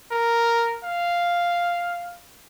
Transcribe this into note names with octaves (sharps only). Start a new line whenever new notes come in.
A#4
F5